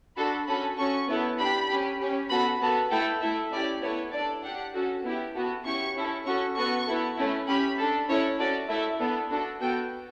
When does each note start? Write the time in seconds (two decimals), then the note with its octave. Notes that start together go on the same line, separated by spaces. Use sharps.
0.16 D4 F#4 A4 B5
0.47 C#4 F#4 A4 B5
0.78 C#4 F#4 A4 C#6
1.08 B3 E4 A4
1.39 D4 G4 B5
1.69 C#4 G4
2.00 C#4 G4
2.30 B3 F#4 A4 B5
2.60 B3 F#4 A4 A5
2.91 A3 E4 A4 G5
3.21 A3 E4 A4 E5
3.52 C#4 E4 G4 D5
3.82 B3 E4 A4 C#5
4.12 D4 A4 D5
4.43 D4 G4 F#5
4.74 C#4 F#4 A4
5.04 B3 E4 G4
5.34 B3 F#4 A4
5.65 C#4 E4 G4 C#6
5.95 C#4 E4 A4
6.25 C#4 F#4 A4 C#6
6.56 B3 F#4 A4 C#6
6.86 B3 E4 A4
7.17 A3 C#4 E4
7.47 C#4 G4 B5
7.78 D4 A4
8.08 C#4 E4 A4 C#5
8.39 C#4 F#4 A4 D5
8.69 A3 E4 A4 E5
9.00 B3 D4 A4
9.30 D4 F#4 A4
9.61 B3 F#4 A4 G5